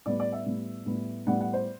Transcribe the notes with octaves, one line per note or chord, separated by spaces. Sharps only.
A2 G3 B3 D5
D5
E5
A2 G3 B3
A2 G3 B3
A2 G3 B3 F#5
F#5
C5